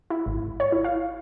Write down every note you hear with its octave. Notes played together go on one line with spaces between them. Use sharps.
E4
G#1
C#5
E4
F5